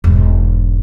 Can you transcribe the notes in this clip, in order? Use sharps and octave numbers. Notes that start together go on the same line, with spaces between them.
E1 G#2